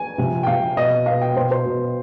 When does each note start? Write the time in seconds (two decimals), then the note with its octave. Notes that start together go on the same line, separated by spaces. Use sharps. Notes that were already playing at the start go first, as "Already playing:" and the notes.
Already playing: G#5
0.18 C3 F3
0.43 G5
0.47 C3 F3 F5
0.77 B2 D#5
1.06 B2 F5
1.21 G5
1.36 B2 C5
1.51 C5
1.66 B2